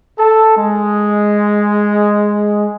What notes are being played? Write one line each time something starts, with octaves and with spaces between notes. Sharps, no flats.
A4 A5
G#3